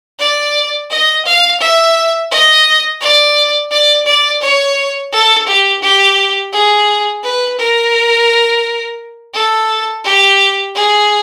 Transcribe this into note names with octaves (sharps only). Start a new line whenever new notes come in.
D5
D#5
F5
E5
D#5
D5
D5
D5
C#5
A4
G4
G4
G#4
B4
A#4
A4
G4
G#4